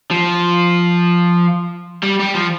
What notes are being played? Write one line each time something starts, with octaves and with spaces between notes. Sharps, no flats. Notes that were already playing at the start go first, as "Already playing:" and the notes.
F3
G3
G3
F3